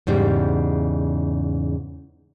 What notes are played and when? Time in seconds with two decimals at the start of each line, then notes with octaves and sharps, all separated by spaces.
0.07 E2 G#2 C#3 G3